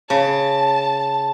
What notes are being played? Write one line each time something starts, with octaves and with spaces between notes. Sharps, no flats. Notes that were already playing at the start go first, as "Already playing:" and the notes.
C#3 A5